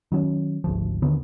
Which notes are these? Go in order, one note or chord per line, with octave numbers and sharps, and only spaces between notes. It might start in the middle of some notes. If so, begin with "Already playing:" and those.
D#3 F#3 C#4
G#1 D2 F3
D#2 D3 D#3 B3